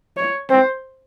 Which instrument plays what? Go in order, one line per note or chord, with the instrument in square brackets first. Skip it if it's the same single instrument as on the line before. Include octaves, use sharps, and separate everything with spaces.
[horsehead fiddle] C#5
[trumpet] C4 [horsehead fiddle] C5